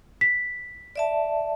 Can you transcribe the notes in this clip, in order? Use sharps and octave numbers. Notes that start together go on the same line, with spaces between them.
B6
D5 E5 A5